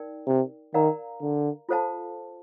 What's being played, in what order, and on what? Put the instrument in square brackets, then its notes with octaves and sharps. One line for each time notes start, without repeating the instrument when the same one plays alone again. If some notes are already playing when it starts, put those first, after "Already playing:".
Already playing: [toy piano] D#4 A#4 D5 G5
[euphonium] C3
[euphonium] D#3 [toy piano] A#4 D5 F5 A#5
[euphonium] D3
[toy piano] F4 A4 C5 F5 A5